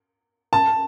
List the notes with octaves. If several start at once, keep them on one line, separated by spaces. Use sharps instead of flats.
A5